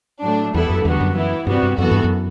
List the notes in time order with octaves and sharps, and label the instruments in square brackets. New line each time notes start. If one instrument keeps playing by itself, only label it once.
[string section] A2 F#3 A3 D4
[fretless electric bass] E2 [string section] G3 B3 E4 A4
[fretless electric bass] F#2
[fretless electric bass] E2 [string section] D3 G3 B3 F#4
[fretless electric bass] F#2
[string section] E3 B3 E4
[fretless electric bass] G2 [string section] C3 G3 B3 F#4
[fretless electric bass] G2
[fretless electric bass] F#2 [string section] E3 B3 F#4 A4
[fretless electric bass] G2
F#2